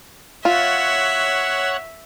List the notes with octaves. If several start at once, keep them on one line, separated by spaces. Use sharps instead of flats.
F4 C#5 E5 F#5